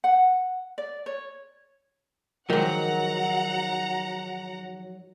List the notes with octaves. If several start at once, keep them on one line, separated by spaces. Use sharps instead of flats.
F#5
D5
C#5
G#2 D#3 F3 F#3 F#5 A#5